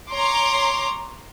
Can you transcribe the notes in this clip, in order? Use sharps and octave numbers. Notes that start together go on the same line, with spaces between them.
C#5 A#5 C6 D6